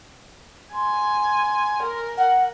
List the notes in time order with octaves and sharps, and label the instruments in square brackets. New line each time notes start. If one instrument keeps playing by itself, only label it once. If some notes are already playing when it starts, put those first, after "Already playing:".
[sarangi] G#5 [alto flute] C6
[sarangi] A#4
[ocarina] F#5